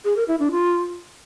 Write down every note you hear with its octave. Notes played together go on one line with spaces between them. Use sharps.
G#4
A#4
E4
D4
F4